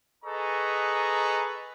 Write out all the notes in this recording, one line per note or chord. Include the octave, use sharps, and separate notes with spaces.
G#4 A4 B4 D#5 A#5 C#6